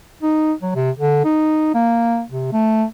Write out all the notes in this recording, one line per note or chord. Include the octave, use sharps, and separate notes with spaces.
D#4
F#3
C3
D3
D#4
A#3
C3
A3